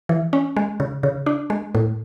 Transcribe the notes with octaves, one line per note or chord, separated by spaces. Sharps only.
E3
C#4
G#3
C#3
C#3
D4
G#3
A2